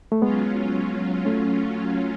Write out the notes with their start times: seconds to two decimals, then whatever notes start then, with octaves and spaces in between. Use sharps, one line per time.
0.12 A3
0.21 F#3 G#3 B3 C#4 F4
1.25 A3 C#4